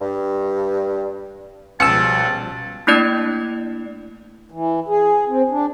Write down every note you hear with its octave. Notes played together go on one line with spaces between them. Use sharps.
G2
C#2 B2 F3 G3 A5 E6 C#7
A3 A#3 D4 E4 D5 G#6
E3
G#4
C4
D4